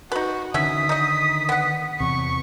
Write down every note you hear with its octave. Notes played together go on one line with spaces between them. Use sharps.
D#4 F#4 B4
D3 D#3 C#4 F#4 E5 D#6 B6
D#4 D#5
B3 F#5
E2 C3 C#6